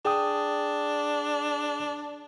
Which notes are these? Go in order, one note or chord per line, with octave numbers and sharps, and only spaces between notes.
D4 G#4 G5 D#6